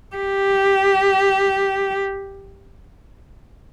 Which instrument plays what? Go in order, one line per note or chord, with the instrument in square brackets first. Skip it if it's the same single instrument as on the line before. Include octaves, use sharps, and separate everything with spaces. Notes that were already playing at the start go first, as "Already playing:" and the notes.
[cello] G4